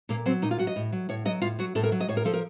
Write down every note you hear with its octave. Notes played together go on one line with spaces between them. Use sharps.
A#2 A#3
F#3 C4
A#2 D#4
F4
F#3 F#4
D#5
A2
F#3
A2 C#5
F#3 D#5
A2 F4
F#3 F#4
A2 A4
A#4
F#3
D#5
A2 C#5
A#4
F3 A4
A#4